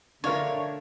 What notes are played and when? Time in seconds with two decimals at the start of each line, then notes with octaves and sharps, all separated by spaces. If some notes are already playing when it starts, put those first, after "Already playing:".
0.24 D3 A3 D4 F4 A#4 C#5